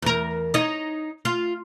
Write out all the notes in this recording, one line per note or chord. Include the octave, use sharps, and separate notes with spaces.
E2 A#4
D#4 C#5 D#5
F4